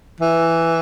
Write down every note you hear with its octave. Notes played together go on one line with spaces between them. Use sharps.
E3